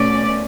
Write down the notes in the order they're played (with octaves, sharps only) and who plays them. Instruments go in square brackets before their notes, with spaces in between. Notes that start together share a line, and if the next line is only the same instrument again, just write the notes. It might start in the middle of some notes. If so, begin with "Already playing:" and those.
Already playing: [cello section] B2 A3 C#4 D5